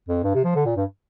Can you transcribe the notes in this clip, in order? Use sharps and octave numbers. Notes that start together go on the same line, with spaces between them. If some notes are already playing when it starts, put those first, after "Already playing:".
F2
G2
C3
F3
D3
A#2
G2